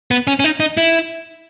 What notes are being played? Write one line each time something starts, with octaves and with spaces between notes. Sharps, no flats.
B3
C#4
C#4
D#4
D#4
E4